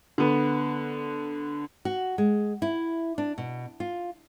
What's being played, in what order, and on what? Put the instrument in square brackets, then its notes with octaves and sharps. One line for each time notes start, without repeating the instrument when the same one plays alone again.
[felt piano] D3 B3
[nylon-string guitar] F#4
G#3
E4
D4
B2
F4